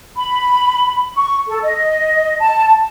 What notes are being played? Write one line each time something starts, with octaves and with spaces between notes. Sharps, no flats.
B5
C#6
A4
D#5
A5